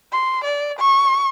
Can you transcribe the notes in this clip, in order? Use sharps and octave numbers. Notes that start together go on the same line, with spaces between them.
C6
D5
C#6